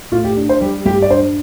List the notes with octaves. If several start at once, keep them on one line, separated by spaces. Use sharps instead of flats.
A2 F4
G4
D4
C5
G3 G4
G2 G4
D5
D4 C5